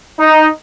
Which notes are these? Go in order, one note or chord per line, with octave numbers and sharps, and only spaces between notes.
D#4